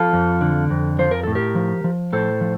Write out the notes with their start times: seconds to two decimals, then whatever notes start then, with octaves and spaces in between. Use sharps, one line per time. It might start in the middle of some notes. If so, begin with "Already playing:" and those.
Already playing: F3 F4 A4
0.13 F2
0.41 D3
0.70 F2
0.99 F3 C5
1.11 A#4
1.23 A2 A4
1.35 G4 A#4
1.55 F3
1.84 F3
2.13 A2 A4 C5
2.41 F3